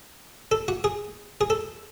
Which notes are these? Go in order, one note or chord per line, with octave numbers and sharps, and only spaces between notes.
A4
F#4
G#4
G#4
A4